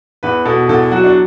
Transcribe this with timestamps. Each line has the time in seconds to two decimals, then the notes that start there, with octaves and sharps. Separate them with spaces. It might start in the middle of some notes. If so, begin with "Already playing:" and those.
0.23 E2 B4
0.45 B2 A4
0.69 E2 A4
0.91 F#3 F#4
1.04 D4